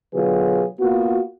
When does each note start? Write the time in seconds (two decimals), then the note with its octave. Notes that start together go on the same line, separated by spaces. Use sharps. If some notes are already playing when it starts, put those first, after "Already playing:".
0.14 B2 D3 F#3 F4 G#4 B4
0.79 A#3 B3 F4 F#4